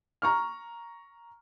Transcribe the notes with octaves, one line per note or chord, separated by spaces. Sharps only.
A#5 C#6 F6